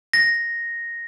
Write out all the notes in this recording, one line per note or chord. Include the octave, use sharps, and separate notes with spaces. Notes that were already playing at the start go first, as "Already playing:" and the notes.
A#6